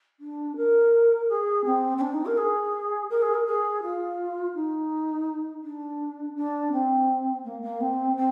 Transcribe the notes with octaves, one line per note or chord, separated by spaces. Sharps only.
D4
A#4
G#4
C4
C4
D4
D#4
A#4
G#4
A#4
G#4
A#4
G#4
F4
D#4
D4
D4
C4
A#3
A#3
C4
C4